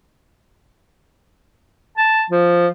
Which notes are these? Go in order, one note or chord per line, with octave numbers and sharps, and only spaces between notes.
A5
F3